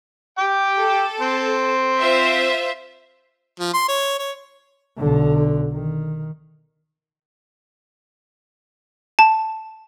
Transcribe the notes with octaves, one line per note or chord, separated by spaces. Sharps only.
G5 D6
A4
C4 C6
F4 C5 E5
F3
C6
C#5
C#5
B1 D3
D#3
A5